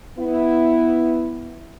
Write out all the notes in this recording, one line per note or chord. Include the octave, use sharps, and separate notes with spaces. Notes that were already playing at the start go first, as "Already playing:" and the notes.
B3 E4